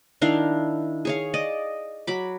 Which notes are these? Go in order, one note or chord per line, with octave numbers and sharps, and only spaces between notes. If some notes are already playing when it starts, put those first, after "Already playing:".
D#3 D4 E4 F5
G#4 C#5 F5
D5 D#5
F#3 B5 D6